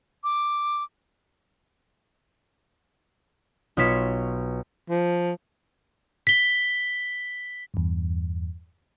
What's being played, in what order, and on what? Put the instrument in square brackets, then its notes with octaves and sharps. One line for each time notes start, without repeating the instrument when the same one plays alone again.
[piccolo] D6
[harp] B1 B3 F4 C#5 B6 E7
[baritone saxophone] F3
[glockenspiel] B6 G7
[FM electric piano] E2 G2